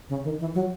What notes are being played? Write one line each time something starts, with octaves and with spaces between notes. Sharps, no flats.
C#3
D#3
E3
F#3